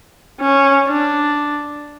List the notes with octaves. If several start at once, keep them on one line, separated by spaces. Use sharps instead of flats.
C#4
D4